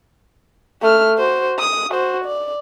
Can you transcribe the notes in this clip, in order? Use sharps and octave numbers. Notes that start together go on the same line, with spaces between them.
A3 F6
F#4 C5
D#6
F#4 C5
D5